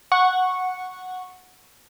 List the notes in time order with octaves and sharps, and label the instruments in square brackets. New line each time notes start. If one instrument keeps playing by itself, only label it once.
[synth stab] F#5 C#6